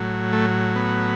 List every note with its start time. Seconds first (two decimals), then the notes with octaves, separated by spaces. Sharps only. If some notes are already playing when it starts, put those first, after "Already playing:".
Already playing: A2 F#3
0.33 A3
0.76 B3